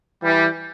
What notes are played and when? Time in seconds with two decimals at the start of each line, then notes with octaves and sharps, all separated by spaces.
0.23 E3 G3